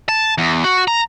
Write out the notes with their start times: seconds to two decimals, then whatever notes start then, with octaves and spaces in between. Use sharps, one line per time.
0.09 A5
0.38 E2
0.64 F#4
0.88 A#5